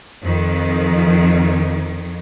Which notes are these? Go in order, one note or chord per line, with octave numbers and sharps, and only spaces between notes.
F2 D#3